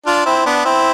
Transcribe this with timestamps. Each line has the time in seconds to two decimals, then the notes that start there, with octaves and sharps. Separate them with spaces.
0.06 D4 F4
0.26 C4 E4
0.46 B3 D4
0.65 C4 E4